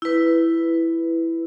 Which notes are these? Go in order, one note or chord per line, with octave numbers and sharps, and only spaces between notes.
E4 B4